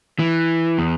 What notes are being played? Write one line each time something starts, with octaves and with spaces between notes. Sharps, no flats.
E3
E2